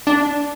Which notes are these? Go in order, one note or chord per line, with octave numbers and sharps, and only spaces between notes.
D4